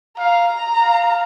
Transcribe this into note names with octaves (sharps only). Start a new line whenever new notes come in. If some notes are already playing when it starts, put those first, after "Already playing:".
F5 A#5
F5